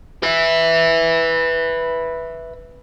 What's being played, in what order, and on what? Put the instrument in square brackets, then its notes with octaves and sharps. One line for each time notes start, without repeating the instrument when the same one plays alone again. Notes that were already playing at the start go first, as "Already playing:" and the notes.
[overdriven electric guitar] B4 E5